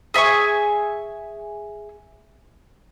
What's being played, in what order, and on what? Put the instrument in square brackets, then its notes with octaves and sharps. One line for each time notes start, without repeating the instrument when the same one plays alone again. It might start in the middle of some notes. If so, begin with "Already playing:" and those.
[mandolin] G#4 E5 G#5 C#6